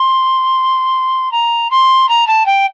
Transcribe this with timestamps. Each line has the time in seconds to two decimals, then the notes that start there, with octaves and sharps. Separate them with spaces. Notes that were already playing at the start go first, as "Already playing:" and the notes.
Already playing: C6
1.32 A#5
1.70 C6
2.09 A#5
2.27 A5
2.46 G5